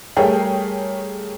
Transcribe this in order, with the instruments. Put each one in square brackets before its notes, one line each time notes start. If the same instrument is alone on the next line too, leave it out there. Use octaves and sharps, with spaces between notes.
[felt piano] G3 A3 G#4 A#4 C#5 G5